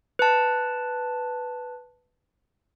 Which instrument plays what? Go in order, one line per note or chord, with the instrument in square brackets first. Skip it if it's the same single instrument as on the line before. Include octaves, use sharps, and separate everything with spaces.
[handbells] B4 A5